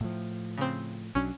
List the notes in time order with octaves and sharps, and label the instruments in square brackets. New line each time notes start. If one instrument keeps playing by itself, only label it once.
[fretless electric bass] A2 F3
[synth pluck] C#3 C4
[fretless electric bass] B1 F#3 D4 [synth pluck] C#4